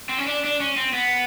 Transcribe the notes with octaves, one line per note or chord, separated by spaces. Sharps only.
C4
C#4
D4
D4
C#4
C4
B3